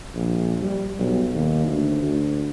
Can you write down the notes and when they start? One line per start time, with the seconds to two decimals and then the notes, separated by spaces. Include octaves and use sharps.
0.15 A#1
0.62 G3
0.99 B1
1.35 D#2
1.66 D2
2.02 D2